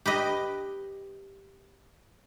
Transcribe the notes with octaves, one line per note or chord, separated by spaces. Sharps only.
G4 B4 D#5